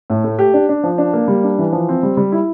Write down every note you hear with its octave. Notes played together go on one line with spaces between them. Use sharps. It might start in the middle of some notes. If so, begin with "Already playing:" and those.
A2
A3
G4
D4
D4
F3
D4
A#3
G3
D4
E3
F3
C4
G3
G3
E4